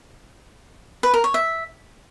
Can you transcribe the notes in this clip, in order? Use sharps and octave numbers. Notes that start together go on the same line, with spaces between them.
B4
A#4
C#5
E5